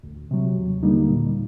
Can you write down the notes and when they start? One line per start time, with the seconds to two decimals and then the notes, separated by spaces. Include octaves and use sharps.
0.04 D2
0.31 C3 F#3
0.57 D#2
0.83 D3 G3 A#3 D#4
1.08 A#2